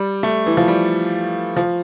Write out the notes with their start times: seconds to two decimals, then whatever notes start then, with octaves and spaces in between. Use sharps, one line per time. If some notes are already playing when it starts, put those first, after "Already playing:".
Already playing: G3
0.23 A3
0.46 E3
0.57 F3
0.68 G3
1.57 F3